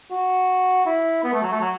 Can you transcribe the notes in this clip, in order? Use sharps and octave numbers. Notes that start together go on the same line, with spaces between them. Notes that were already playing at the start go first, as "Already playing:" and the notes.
F#4
E4
B3
A3
F#3
A3
F#3